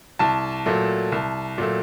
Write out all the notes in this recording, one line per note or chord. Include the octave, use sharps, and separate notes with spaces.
C2 A5
A#2 F#3 A3
C2
A#2 F#3 A3